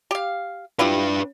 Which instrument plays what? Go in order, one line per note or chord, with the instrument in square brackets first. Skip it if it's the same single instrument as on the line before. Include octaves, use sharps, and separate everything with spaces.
[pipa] G4 F5
[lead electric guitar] D4 B4 [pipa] E4 F4 G4